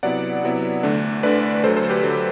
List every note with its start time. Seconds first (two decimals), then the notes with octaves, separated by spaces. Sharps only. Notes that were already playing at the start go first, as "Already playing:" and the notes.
0.03 C3 F#3 B3 E4 D5 F#5
0.43 C3 F#3 B3 E4
0.83 D2 D3 A3 D4
1.23 D2 D3 A3 D4 B4 D5
1.63 D2 D3 F#3 A4 C5
1.76 A4 C5
1.90 G4 B4
2.03 D2 D3 F#3